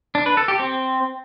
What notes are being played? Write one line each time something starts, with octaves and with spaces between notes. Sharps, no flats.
D4
B4
A4
G4
C4